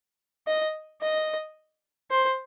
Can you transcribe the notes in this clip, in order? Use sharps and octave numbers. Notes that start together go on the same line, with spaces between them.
D#5
D#5
C5